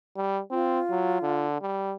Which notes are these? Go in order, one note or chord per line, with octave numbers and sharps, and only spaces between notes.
G3
C4 F4
F#3
D3
G3